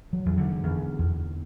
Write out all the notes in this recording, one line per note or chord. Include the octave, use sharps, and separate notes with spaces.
F#3
E2
D3
E2
E2